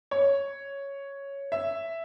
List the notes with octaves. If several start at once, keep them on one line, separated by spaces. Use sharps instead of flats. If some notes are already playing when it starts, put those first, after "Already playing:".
C#5
E5